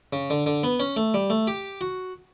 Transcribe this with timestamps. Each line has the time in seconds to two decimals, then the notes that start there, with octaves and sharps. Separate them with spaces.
0.13 C#3
0.30 D3
0.46 D3
0.64 B3
0.80 C#4
0.97 A3
1.14 G3
1.30 A3
1.47 G4
1.81 F#4